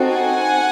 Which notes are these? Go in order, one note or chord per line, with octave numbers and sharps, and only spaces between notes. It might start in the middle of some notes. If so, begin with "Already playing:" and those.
Already playing: C4 D#4 F#4 A4
F#5 G#5